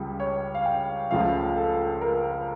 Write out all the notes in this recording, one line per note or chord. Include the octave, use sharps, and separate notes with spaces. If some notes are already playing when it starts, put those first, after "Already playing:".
Already playing: C#2 C#3 G3
C#5
F5
G5
C#2 C#3 F3 A3 F5
A4
A#4